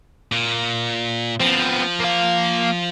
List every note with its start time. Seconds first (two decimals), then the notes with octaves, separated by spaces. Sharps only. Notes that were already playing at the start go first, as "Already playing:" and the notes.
0.32 A#2
1.40 F3 B3 C4
2.00 A#3 F5